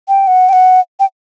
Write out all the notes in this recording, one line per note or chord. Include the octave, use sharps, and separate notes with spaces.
G5
F#5
G5
F#5
G5